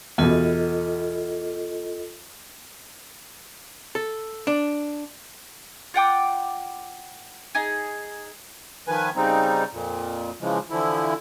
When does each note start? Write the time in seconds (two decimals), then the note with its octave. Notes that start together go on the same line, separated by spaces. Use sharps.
0.18 E2 B2 F4 A4 D#5
3.95 A4
4.47 D4
5.94 F4 F#5 G5 D6
7.55 D#4 G#4
8.88 D#3 F3 B4 G#5
9.16 C#3 G3 C4 D#4
9.72 F2 A#2
10.41 C#3 E3 F3 G#3
10.70 D3 E3 F3 E4